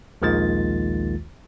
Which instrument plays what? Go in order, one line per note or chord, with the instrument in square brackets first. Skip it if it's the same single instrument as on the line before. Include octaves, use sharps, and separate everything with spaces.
[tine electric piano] A#1 D#2 D#3 G#3 F4 A6